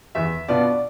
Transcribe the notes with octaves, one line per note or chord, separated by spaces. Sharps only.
E2 E5
B2 B3 D4 F4 D5